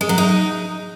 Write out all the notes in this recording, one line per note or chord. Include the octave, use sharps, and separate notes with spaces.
G#3
F#3
D#4